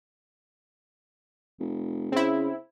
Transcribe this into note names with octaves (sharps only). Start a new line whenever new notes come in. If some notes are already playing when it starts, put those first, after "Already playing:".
F1
C#3 C4 E4